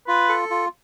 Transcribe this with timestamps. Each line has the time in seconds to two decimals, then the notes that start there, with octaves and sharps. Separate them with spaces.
0.07 F4 B4
0.29 A4
0.50 F4